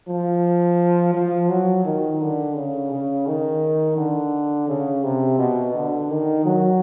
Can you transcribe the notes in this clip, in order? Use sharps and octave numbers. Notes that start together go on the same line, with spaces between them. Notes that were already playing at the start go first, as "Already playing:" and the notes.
F3
F3
F#3
D#3
D3
C#3
C#3
D#3
D3
C#3
C3
B2
D3
D#3
F#3